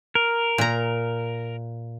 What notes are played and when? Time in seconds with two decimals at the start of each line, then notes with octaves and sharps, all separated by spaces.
0.15 A#4
0.58 A#2 A#5